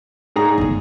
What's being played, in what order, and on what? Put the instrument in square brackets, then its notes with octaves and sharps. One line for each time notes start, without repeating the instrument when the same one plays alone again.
[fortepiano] G#2 G#4 A#5
[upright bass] G1 A2